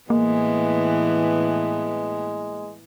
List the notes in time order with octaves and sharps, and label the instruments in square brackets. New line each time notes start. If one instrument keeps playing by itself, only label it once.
[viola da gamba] A2 E3 B3 [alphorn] G#3 [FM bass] A#3